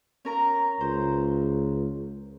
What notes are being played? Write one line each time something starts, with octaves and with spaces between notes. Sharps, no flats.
C#4 A#4 A#5
C#2 C5